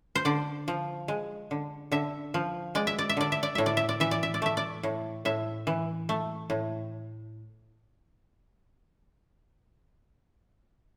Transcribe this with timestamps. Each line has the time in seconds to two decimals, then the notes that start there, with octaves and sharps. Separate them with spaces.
0.15 C5
0.25 D3 D5
0.68 F3
1.08 G#3
1.51 D3
1.92 D3 E5
2.34 F3
2.75 G#3 D5
2.87 E5
2.98 D5
3.09 E5
3.17 D3 D5
3.32 E5
3.43 D5
3.55 A2 E5
3.66 D5
3.77 E5
3.89 D5
4.00 E3 E5
4.11 D5
4.23 E5
4.34 D5
4.42 A3 E5
4.57 D5
4.83 A2
5.25 A2 E5
5.67 E3
6.09 A3
6.50 A2